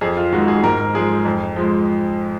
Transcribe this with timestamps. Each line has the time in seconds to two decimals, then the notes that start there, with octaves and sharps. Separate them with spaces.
0.01 F2 G#4
0.17 F4
0.32 D#3 G#3 F#4
0.48 G#4
0.63 G#2 A#4
0.94 F3 G#3 G#4
1.25 F2
1.56 F3 G#3